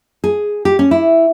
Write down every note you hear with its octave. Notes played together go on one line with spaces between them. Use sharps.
G#4
G4
C#4
E4